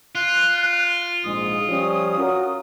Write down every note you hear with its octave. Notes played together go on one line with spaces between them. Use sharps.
F4 F#6
A#1 G#2 G#3 D#6
F3 G3 C#4
C#4 F#4 A#4